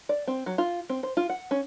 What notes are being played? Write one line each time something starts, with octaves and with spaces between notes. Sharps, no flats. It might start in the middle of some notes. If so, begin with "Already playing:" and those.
D5
C4
F#3
F4
C4
C5
F4
F#5
C#4